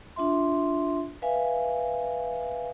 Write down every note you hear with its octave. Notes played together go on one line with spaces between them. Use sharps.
D4 F4 E5 C6
B4 E5 F5 G#5